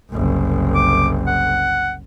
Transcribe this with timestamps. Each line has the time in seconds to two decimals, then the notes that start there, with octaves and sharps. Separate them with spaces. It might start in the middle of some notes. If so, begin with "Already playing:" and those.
0.11 F#1 C2
0.75 D6
1.27 F#5